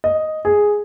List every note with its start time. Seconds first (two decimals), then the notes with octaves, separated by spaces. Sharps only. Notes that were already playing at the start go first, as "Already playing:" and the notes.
0.04 D#5
0.45 G#4